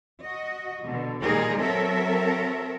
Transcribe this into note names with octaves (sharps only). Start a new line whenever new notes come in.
F#4 D#5
B2 D3
A#2 D#3 G3 D#4 G#4 A#4
F#3 C4 A4 A#4 C#5 E5